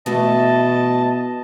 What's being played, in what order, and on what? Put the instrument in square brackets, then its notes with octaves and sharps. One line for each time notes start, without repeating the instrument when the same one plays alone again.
[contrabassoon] B2 [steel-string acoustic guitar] E3 A3 E5 [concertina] D#5 A5